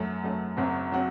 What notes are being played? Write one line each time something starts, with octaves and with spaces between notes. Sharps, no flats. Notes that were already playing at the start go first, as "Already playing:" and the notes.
Already playing: F#2 F#3 A3
F#2 F#3 A3
F#1 F#2 F#3 C4 F#4
F#3 C4 F#4